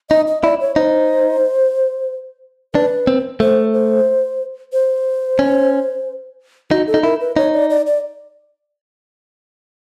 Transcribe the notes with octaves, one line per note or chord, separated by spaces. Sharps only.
D#4 D#5
D#5
E4 D5
C#5
D#4 C5
D4 B4
C4
A3 C5
C5
C5
C#4
D#4 F#4
A4
D#4
E4 A#4
B4
D#4 C#5
D5
D5
D5